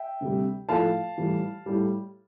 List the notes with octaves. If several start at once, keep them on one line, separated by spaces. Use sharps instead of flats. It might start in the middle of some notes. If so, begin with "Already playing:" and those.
Already playing: E5 G5
D2 C3 G3
A2 F3 A3 F5 A5
A2 E3 G3
A2 G3